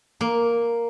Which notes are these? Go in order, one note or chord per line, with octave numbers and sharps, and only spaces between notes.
A#3